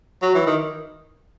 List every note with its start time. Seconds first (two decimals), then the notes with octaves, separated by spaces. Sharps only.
0.22 F#3
0.34 E3
0.47 D#3